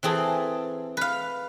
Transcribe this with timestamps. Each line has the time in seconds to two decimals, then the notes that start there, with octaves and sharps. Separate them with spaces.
0.03 E3 C4 G#4 A4
0.97 B4 F5